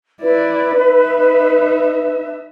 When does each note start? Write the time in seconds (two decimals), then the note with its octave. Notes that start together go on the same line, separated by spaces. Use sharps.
0.22 E4 B4 D5
0.79 D#4 E5